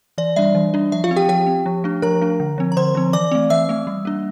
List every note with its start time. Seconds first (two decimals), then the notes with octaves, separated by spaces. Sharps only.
0.18 E3 D5
0.36 G3 D4 E5
0.55 E3
0.74 G3 D4
0.92 F3 E5
1.04 F4 F5
1.11 C4
1.16 G4 G5
1.29 F3 G4 G5
1.47 C4
1.66 F3
1.84 A3 D4
2.02 F3 A#4 A#5
2.22 A3 D4
2.40 D3
2.58 F3 C4
2.72 A#5
2.77 D3 C5 C6
2.95 F3 C4
3.13 E3 D5 D6
3.32 A3 C4
3.50 E3 E5 E6
3.69 A3 C4
3.87 G3
4.05 A#3 D4